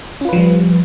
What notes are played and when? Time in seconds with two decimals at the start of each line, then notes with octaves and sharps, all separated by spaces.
0.21 C#4
0.25 F4
0.29 B4
0.33 F3
0.37 G3